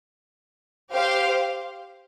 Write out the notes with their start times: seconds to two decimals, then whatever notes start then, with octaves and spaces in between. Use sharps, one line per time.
0.92 G4 C5 F5